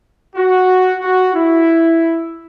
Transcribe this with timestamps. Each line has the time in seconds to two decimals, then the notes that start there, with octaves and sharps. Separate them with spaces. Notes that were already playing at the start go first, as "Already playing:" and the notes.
0.36 F#4
1.02 F#4
1.35 E4